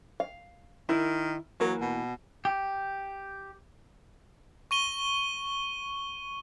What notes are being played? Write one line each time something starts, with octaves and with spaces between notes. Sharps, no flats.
F5
D#3 E4 A#4
E3 F#3 A#3 A#4
B2
G4
C#6 D#7 G7